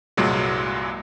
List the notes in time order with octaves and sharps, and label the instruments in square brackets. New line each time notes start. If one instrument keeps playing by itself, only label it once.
[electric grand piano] C2 G2 A#2 F#3 G#3